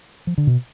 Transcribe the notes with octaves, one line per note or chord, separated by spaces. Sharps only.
F3
D3
B2